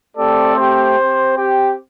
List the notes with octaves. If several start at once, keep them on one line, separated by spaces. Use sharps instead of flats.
A3 C4 G4 A4 D5
G4 C5
C4 G4
G4